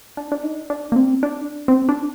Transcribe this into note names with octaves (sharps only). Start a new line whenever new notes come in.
D4
D4
D#4
D4
A#3
C4
D4
C4
D4